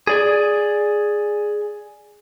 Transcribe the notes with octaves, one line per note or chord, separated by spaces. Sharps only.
G#4 D5 G#5